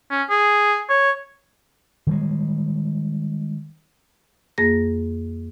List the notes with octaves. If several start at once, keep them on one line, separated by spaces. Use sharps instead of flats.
C#4
G#4
C#5
D#3 G3 G#3
F2 A#3 G#4 A#6